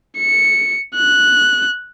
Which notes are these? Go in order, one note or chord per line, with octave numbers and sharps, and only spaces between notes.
C#7
F#6